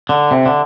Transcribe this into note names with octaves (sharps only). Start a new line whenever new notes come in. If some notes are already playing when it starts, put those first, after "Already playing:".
D3
C3
D3